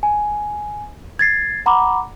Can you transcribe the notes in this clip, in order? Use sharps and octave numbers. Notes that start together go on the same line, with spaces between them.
G#5
G#6 A6 C7
F#5 A#5 B5 D6